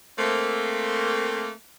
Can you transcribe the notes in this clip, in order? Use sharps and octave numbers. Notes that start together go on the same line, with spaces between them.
A3 A#3 C4